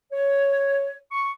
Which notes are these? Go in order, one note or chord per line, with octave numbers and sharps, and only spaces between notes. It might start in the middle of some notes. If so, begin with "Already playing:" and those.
C#5
C#6